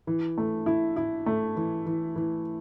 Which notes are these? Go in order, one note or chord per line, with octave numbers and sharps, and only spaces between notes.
E3
A3
E4
E4
A3
E3
E3
E3